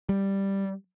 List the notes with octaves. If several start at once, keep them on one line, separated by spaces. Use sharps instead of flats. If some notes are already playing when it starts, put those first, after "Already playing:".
G3